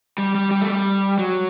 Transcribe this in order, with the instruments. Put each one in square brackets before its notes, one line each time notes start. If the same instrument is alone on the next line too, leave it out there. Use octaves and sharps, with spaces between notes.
[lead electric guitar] G3
G3
G3
A3
G3
F#3